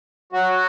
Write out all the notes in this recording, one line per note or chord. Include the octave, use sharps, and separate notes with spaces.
F#3 F#4